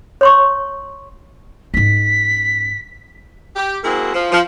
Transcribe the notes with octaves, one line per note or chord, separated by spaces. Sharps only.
C#5 C6 C#6
G#2 C#4 B6
G4
G#3 A#3 C4 E4 F#4 G#4
F3
F3